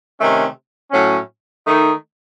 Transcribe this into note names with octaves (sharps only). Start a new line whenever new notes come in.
C3 D#3 A3 C#4
A2 F#3 C#4
D#3 A3 D#4